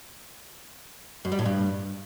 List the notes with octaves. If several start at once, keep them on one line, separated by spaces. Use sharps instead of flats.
F#2
G3
A2
G2